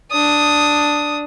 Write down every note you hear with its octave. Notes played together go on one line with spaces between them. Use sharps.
D4 D#6